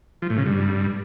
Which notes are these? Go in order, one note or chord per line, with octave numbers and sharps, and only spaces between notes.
F3
A2
C#3
G2